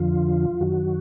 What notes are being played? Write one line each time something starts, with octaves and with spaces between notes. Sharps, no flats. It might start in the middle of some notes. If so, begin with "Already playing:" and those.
Already playing: F2 D3 F3 F4
F#2 D#3 F#3 F#4